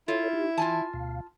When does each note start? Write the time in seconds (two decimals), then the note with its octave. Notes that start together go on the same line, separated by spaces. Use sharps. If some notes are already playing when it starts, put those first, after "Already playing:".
0.08 E4 F4 A4 C#5
0.33 D#4 G4
0.58 E3 F4 G#5 A5
0.93 D2 B2 F5